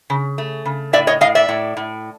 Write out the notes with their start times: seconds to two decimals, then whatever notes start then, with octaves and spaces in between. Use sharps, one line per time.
0.10 C#3
0.38 A3
0.65 C#3
0.93 A2 D5 E5
1.07 C#5 D#5
1.21 A2 D#5 F5
1.35 D5 E5
1.49 A2
1.77 A2